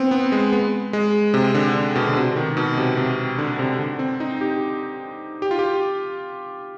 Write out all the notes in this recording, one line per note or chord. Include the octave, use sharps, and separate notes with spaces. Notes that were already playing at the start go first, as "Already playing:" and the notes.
Already playing: B3 C4
B3
G#3
B3
G#3
C3
D3
D3
B2
D3
C3
D#3
B2
C3
C3
D3
C3
D3
C4
D#4
G4
G4
F4
G4